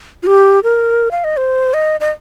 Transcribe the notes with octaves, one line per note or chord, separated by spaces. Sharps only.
F4
G4
A#4
F5
D#5
C5
D#5
D#5